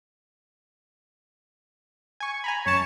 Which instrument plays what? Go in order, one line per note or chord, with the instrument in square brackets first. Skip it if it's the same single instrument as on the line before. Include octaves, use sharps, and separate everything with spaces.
[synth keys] G#5 C#6
G#5 A#5 B5
[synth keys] F#2 A5 [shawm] C#5